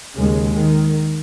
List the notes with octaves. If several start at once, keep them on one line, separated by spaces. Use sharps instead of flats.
D#2 C#3 G#3
D#3